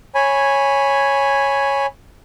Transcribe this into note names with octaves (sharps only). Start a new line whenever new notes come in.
C#5 G#5 B5